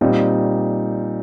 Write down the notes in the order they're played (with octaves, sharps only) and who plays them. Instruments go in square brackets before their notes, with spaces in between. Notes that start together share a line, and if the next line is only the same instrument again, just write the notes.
[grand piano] A#2 G3 C4 D#4